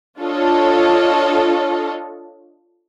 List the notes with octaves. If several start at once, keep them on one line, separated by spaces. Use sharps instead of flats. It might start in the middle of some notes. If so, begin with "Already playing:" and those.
D4 F4 A4 C#5 D#5